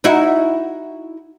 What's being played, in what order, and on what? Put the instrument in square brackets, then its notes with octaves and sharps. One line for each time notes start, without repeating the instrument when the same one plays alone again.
[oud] D#4 E4 F#4